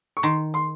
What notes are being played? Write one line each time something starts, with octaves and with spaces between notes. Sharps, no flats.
C#6
D#3 C6
C6